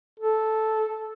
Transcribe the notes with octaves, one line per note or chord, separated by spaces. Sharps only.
A4